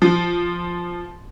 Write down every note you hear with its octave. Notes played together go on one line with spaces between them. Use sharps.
F3